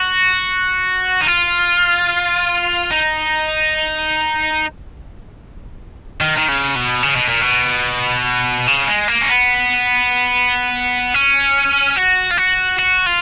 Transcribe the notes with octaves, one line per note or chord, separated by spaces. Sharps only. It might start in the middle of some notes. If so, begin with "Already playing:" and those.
Already playing: F#4
D#4
F4
D#4
D#3
D#3
C#3
B2
C#3
B2
A#2
B2
C#3
G#3
A#3
C#4
B3
C#4
F#4
F4
F#4
F#4
F4